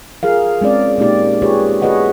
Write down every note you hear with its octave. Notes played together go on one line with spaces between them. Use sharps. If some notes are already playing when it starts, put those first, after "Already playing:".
F4 G#4 A#4 F5
G#3 C4 C#4 D5
A#2 G#3 A#3 D#4 G4 D5
F4 G4 G#4 B4 C#5
F#4 G#4 B4 C#5 D#5 F#5